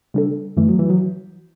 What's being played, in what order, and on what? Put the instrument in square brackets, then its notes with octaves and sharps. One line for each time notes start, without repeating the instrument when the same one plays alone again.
[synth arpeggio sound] C#3 G3 D4 A4
[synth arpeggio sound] F#2 D3 A3 [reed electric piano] E3
[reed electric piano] F#3
E3
F#3